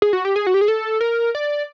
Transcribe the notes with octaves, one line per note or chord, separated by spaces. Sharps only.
G#4
F#4
G4
G#4
F#4
G4
G#4
A4
A#4
D5